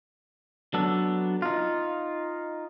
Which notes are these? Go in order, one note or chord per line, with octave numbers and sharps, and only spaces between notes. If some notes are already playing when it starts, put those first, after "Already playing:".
F#3 B3 D4 A4
D#4 F4